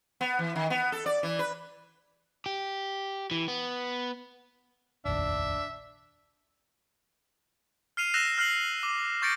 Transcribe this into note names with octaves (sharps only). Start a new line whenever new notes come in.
B3
E3
D#3
B3
A4
D5
E3
B4
G4
E3
B3
F1 A#1 D#2 D4 E5
F6 C7 D#7 F7
E6 F#6 A#6 C7 E7 F7
F6 F#6 C7 F#7
D6
C#6 G6 A6 A#6 C#7 D7